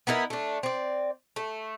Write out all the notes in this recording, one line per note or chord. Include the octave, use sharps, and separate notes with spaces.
B3 D#4 E4 A#4
A3 D4
C4 D5
A3